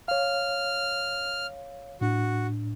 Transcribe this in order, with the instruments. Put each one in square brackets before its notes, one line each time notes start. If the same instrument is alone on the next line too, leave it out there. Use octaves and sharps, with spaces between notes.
[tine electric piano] C#5 F5 [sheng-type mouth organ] F6
[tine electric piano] A2 D4 [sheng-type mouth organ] F#4